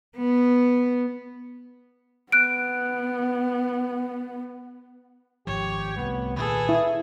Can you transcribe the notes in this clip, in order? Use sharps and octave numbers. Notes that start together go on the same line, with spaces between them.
B3
B3 F#6 D7
G#1 F3 G4 C#5
C2 A3 B3
A#2 D#3 G#4 A4 B4
E4